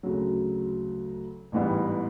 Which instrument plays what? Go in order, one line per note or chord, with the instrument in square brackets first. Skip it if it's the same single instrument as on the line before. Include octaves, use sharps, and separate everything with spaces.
[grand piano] D2 C#3 F#3
A1 G#2 E3 G3 B3